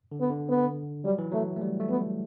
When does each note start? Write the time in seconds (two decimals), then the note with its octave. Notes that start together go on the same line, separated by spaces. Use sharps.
0.12 D3
0.21 B3
0.30 D3
0.49 B3
1.05 F#3 G3
1.18 E3
1.31 F#3 A3
1.56 A3
1.61 G3
1.80 A3
1.90 B3